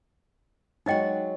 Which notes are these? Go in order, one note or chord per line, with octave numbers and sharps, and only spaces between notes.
F#3 G#3 D#4 F#4 D#5 G5